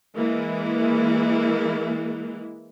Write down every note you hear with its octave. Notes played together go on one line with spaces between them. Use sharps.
E3 G#3 A#3 E4